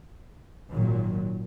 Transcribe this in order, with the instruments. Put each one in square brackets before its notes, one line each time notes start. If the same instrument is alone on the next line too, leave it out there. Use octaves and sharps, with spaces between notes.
[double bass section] G#1 A#2 D#3 F#3